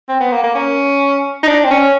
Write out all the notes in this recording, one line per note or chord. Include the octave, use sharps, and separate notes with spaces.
C4
B3
A#3
A#3
C#4
D#4
D4
C4
C#4